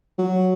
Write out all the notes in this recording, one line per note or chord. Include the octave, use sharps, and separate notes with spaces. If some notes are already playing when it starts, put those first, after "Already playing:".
F#3